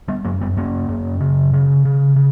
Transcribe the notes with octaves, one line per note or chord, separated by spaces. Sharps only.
G3 B3
F#2 F#3 A#3
G3 B3
F#2 A#3 C#4
F#2
C#3
C#3
C#3
C#3